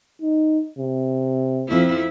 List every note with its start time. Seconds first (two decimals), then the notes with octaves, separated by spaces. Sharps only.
0.22 D#4
0.79 C3
1.68 F2 E4